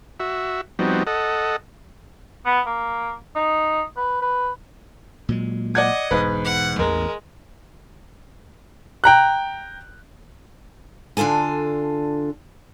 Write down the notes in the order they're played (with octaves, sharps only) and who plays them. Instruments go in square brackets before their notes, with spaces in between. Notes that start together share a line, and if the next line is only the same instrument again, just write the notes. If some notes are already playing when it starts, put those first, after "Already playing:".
[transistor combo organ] F#4 E5
F3 G3 B3 C4 D#4 F#4
A4 D#5 F#5
[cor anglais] B3
A#3
D#4
B4
B4
[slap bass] A#2 F#3 G#3
[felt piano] D5 F#5 G#6 [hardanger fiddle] D#5
[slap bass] E1 [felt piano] G#2 B4
[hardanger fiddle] F#5
[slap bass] A1 E2 E3 [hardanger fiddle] G#3 [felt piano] A#4
[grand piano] G5 A#5 F#6
[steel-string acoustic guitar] D3 D4 F4 A4 G#5